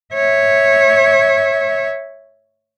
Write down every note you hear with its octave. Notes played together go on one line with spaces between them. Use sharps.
C#5 E5